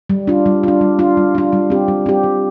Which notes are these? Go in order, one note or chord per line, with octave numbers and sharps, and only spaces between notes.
G3
D4 F4
G3
D4 F4
G3
D4 F4
G3
D4 F4
G3
C4 G4
G3
C4 G4
G3